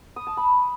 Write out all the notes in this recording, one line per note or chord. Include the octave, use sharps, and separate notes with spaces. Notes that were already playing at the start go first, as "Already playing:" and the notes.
D#6
A5
B5